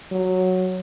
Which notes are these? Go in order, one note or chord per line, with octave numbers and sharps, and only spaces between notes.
F#3